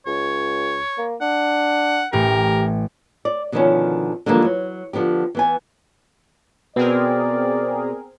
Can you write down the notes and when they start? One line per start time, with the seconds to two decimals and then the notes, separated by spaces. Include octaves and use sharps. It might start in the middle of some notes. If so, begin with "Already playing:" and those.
0.06 C#2 C#5
0.98 A#3
1.21 D4 F#5
2.13 A1 A2 G4 A#4
3.25 D5
3.52 B2 D3 D#3 F3 B3 C#4
4.26 D3 E3 F3 G3 G#3 A#3
4.45 F#3
4.93 D3 F3 B3 G4
5.35 E3 B3 G#5
6.76 B2 B3 C4 G#4 A#4 D5